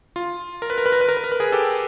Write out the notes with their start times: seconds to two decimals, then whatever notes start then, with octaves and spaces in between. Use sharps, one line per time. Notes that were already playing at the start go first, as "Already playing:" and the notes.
0.16 F4
0.62 A#4
0.70 B4
0.78 A#4
0.86 B4
0.92 A#4
1.01 B4
1.09 A#4
1.17 B4
1.24 A#4
1.32 B4
1.40 G#4 A#4
1.52 G4 A4